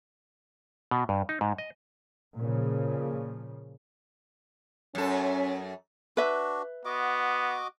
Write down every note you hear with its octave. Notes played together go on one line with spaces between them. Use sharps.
B2
G2
D#4
G#2
D#5
A#2 C#3 F3
F#2 C#4 A4
D4 F#4 B4 E5
B3 F#4 D#5 D6